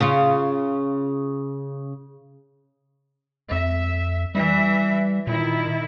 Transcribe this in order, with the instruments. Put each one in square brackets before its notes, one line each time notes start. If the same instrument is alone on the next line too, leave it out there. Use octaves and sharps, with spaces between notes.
[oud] C#3 F4
[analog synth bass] F2 [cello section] E5
[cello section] E3 E5 [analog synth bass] G3
[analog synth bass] A#2 [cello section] D#3 E4